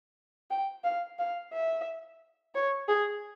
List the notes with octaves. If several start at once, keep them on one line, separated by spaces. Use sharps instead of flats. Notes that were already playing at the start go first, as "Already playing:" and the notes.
G5
F5
F5
E5
C#5
G#4